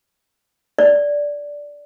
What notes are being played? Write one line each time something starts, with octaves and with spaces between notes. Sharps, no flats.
D5